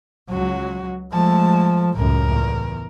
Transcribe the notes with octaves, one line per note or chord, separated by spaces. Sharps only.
C#2 F#3 F#4
F3 G#3 A3 A5
C#2 F#2 A2 A#4
E2